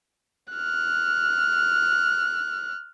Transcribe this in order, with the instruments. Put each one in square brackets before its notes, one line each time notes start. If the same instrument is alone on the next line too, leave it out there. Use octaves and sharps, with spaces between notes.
[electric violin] F6 F#6